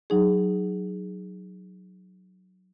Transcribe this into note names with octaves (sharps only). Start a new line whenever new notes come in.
F#3 D#4 G#4